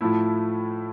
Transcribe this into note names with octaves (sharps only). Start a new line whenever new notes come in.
A2 F3 A3 E4